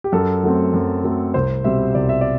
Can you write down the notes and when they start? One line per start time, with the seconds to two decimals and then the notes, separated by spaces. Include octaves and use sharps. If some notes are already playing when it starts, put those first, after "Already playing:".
0.04 G4
0.12 F#2 A4
0.43 F#3 A3 C4
0.74 F#2
1.04 F#3 A3 C4
1.34 C2 C5
1.64 B2 G3 C4 E5
1.95 C2 D5
2.09 E5
2.21 D5